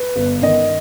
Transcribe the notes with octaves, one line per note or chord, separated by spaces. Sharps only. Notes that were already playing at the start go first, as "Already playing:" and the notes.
Already playing: B4
G1
D#3 D#5